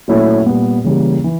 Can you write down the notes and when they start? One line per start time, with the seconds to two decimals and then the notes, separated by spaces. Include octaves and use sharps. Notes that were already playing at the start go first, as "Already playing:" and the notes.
0.08 A#2 F#3 A3 C#4 E4
0.46 A#2 G3 B3
0.84 C#3 E3 G3 A#3
1.24 E3